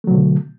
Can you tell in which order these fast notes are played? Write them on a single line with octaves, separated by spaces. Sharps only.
A3 F#3 B2 D3